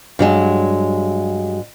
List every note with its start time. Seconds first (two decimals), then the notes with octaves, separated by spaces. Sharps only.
0.19 G2 F#3 G#3